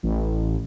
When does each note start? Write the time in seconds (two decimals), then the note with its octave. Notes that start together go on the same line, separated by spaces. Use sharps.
0.03 A1